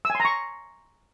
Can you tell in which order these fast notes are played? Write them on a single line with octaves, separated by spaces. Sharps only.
E6 G#5 C6 A#5 C#6